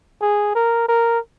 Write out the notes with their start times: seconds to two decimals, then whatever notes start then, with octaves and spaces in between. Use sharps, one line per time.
0.22 G#4
0.55 A#4
0.89 A#4